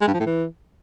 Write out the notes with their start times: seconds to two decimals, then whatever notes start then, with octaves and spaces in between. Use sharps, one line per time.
0.01 G#3
0.08 G2
0.14 F3
0.20 A2
0.26 E3